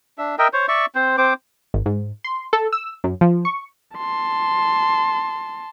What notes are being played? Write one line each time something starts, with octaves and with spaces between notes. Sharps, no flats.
D4 E5
A#4 D#5 E5 G5
C5 C#5
D5 E5 C#6
C4 C5
C4 C5 D6
G#1
G#2
C6
A4
E6
F#2
F3
C#6
A5 C6